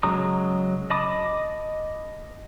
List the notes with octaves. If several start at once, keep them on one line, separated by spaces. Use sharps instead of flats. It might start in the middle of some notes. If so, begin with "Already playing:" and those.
C#3 F#3 G#3 A#5 D#6
D#5 A5 B5 D6 D#6